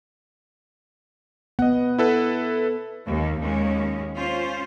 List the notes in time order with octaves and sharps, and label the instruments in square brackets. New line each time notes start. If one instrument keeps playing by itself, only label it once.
[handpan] B3 [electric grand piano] D#5 F#5
[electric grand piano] E4 A4 B4
[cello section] D#2
D#2 G#3 C#4
C#4 F4 C5